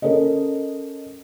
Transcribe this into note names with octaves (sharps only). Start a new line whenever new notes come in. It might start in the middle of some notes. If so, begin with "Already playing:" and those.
C#4 A4 A#4 C#5 D#5